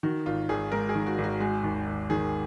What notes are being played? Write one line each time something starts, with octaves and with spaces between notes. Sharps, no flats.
D#3 F#4
G#1 F4
G#1 G#4
G#2 A#4
G#4
D#3
F#4
G#1
F#4
G#3 F#4
D#2
D#2
D#3 G#4